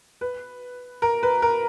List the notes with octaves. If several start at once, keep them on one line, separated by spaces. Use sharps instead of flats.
B4
A#4
B4
A#4